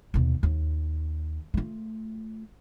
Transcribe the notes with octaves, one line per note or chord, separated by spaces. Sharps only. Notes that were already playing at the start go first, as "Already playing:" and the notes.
D#2 B2
D#2
A3 F4